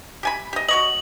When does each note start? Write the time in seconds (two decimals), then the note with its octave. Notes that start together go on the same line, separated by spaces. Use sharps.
0.23 G4 G#5 B5
0.53 G4 D#5
0.69 F#4 C#5 D#5 F#7